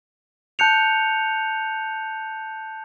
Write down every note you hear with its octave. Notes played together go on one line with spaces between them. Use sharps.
A5 F#6 G6 C#7 F7